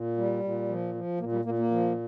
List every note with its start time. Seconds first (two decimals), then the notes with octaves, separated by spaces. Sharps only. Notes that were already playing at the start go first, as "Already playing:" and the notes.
Already playing: A#2
0.17 G3
0.44 A#2
0.69 F3
0.95 F3
1.20 A#2 A#3
1.32 G3
1.45 A#2 A#3
1.59 A#3
1.71 F3